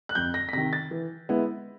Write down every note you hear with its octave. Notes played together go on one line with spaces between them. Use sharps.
F#6
F2 G6
A#6
B6
C3 D#3 A#6
A6
E3
G#3 B3 E4